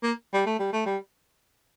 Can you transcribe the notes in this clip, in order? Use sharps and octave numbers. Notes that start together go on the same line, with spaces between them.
A#3
G3
A3
G3
A3
G3